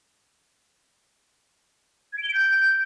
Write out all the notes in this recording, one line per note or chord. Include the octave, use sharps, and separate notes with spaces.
G#6
D7
G7
D7
G6